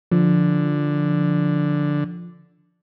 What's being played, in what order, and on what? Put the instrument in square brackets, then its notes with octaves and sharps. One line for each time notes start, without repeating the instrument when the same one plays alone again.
[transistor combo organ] D3 [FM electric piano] F3